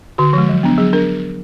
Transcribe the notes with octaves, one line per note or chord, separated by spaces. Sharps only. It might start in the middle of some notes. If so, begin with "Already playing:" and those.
D3 F#4
F3 G#3
F#3
B3 D4
F#3 G#4
D4 A#4